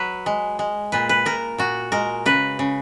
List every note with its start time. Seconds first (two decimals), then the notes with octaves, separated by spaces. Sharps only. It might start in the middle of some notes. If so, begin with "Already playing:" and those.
Already playing: F#3 B4
0.26 G#3
0.59 G#3
0.92 A#2 B4
1.09 B4
1.26 A#2 A#4
1.58 A#2 F#4
1.92 G#3 A#4
2.26 C#3 B4
2.59 C#3